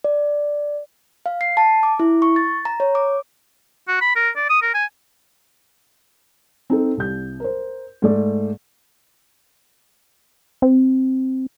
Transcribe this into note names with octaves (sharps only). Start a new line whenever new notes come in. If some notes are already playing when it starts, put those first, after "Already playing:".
D5
F5
C7
A5
D6
E4
C#6
A6
A#5
C#5
D6
F#4
B5
A#4
D5
D#6
A#4
G#5
C4 D#4 A4
C2 G6
A#4 C5
G#2 A3 D5
C4